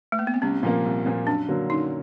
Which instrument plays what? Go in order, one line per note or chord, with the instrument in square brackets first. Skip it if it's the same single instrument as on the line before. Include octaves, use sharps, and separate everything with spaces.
[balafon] A3
A#3
B3
C4
[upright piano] C2 [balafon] C#4
[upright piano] A#2 F3 A#3
C2
A#2 F3 A#3
[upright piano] F#2 [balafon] D4
[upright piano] D3 F#3 A#3
[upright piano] F#2 [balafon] D#4